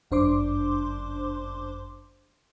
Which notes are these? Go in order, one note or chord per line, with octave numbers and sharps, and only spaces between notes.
G1 F#2 D4 C5 C6 D6